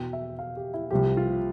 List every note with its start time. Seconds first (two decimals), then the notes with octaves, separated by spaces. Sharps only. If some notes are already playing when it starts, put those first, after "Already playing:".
Already playing: E2 B2 G5
0.13 E5
0.39 F5
0.57 G4
0.74 E4
0.91 C2 C3 F3 G4
1.17 F4